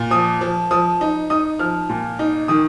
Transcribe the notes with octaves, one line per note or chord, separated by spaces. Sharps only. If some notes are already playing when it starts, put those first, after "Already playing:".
Already playing: A#2
F3 D#6
F3
F3 D#6
D#4
D#4 D#6
F3 F6
A#2
D#4
D#3 D#6